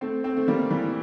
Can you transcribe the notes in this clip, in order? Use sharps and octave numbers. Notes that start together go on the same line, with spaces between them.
A3 C4
A3 C4
A3
G3 A#3
E3 G3